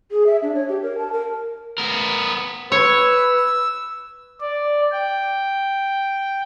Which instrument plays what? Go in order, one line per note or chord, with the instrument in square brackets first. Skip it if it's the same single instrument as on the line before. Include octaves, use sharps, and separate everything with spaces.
[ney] G#4
E5
D4
C#5
G4
A#4
A5
A#4
[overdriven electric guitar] B3 A#4
[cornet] B4 [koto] C#5 [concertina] E6
[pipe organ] D5
G5